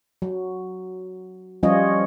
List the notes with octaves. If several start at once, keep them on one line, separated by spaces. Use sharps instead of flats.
F#3
F3 G3 C#4 F4 C#5 D#5